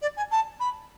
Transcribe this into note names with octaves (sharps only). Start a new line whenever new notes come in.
D5
G#5
A5
B5